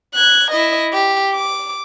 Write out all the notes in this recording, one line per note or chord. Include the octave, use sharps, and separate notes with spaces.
F#6 G#6
E4 D#5
G4
D6